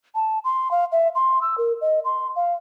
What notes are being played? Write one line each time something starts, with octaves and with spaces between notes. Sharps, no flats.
A5
C6
F5
E5
C6
E6
A#4
D#5
C6
F5